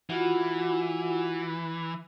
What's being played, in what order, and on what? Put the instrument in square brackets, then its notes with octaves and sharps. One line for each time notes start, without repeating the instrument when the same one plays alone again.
[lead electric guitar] E3 [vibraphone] F4 F#4 F#5